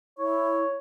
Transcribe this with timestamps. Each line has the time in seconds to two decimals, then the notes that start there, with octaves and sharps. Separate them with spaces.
0.18 E4 C#5